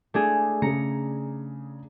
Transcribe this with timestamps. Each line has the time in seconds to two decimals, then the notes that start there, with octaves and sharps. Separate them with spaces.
0.14 A3 D4 G#4
0.62 C#3 G#4 A#5 C#7